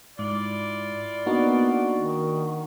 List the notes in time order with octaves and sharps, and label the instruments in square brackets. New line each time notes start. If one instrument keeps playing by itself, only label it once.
[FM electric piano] G#2 [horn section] E4 F4 D5
[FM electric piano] A#3 D4 D#4 [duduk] B3 [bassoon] F#4
[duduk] D#3